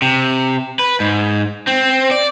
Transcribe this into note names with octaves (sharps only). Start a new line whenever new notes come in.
C3
B4
G#2
C4
D5